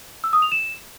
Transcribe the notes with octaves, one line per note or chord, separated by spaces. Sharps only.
E6
D#6
F7
E7